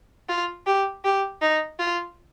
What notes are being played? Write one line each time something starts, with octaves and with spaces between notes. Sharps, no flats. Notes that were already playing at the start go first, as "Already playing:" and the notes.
F4
G4
G4
D#4
F4